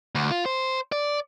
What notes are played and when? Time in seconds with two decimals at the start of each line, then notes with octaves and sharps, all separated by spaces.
0.15 D2
0.31 F4
0.46 C5
0.92 D5